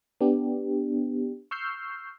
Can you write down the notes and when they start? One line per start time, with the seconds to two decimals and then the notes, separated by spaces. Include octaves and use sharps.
0.21 B3 D4 G4
1.51 C#6 E6 F6 G6 C7